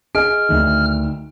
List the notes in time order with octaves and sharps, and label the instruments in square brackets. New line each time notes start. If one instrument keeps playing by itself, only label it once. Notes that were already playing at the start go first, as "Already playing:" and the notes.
[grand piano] G#4 D#5 D7 [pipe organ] F6
[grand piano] D2 D#3